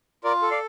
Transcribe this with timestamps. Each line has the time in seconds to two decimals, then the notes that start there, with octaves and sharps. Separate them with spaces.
0.24 F4 A#4 D5
0.42 A4
0.51 D5 F5